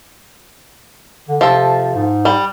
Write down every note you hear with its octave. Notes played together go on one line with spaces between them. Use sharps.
D3
C3 F3 A4
G#2
G3